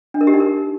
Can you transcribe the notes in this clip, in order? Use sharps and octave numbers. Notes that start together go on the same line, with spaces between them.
D4
A#4
G4
D#4
A#4